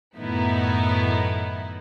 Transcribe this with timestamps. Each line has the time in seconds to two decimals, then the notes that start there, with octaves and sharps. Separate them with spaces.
0.17 F#2 A2 D#3 B3 D#4 E4